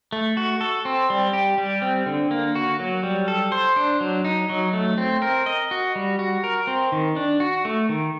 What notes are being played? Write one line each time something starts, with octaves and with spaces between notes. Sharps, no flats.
A3
F#4
A4
C4
G3
G4
G3
C4
D3
A#3
F#4
F#3
G3
A4
C5
D4
F#3
D#4
F#3
A3
C4
A#4
D#5
F#4
G3
F#4
A#4
C4
D#3
D4
F#4
A3
D#3